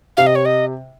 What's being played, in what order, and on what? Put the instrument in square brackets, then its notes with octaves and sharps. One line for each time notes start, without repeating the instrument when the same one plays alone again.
[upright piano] C3 [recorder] F5
[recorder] D#5
C#5
D#5